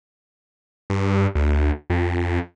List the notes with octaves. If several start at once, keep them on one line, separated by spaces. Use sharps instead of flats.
G2
D2
F2